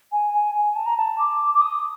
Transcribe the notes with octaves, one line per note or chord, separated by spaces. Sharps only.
G#5
G#5
G#5
A5
A#5
A5
D6
D6
D#6